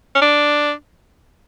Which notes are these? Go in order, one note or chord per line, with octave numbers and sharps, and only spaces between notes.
C#4
D4